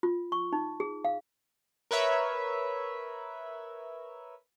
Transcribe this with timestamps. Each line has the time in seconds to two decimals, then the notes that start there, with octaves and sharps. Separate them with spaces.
0.03 F4
0.32 C#6
0.53 D#4
0.80 G#4
1.05 F5
1.91 A#4 B4 C#5 E5